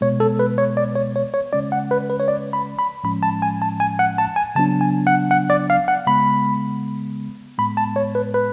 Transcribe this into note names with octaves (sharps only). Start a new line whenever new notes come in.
B2 G#3 B3 C#5
A4
B4
C#5
D5
C#5
C#5
C#5
C#3 G#3 C#4 D5
F#5
B4
B4
C#5
D5
B5
B5
A2 F3 G#3 C#4 B5
A5
G#5
A5
G#5
F#5
A5
G#5
C#3 F#3 B3 D4 A5
G#5
F#5
F#5
D5
F5
F#5
C#3 G#3 B3 B5
A2 G#3 B3 B5
A5
C#5
B4
B4